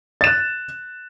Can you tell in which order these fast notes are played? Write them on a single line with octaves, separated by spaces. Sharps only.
A6 E7 F#6